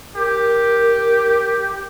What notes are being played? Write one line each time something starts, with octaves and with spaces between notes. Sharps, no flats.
G4 A#4